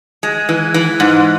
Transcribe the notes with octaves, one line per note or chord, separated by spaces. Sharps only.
G#3
E3
E3
G#2